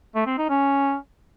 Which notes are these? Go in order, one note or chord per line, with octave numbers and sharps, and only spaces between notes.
A3
C4
D#4
C#4